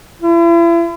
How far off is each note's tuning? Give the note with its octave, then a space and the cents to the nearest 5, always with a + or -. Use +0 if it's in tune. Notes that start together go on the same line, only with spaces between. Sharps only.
E4 +40